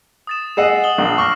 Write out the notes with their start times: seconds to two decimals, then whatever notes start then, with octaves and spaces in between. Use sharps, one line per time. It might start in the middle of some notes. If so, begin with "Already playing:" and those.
0.27 D#6 A6 E7
0.57 G#4 D#5 F#5 E6 C7 E7
0.84 D#6 F#7 G7
0.98 A#1
1.18 C#6 D6 F6 A#6